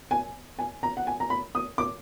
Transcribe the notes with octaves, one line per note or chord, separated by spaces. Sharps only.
G#5
G#5
A#5
F#5
G#5
A#5
B5
D#6
D6